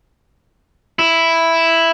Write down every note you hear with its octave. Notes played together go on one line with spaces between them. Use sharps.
E4